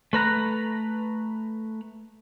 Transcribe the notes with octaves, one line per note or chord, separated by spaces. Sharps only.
A3 B4 A#5 F#6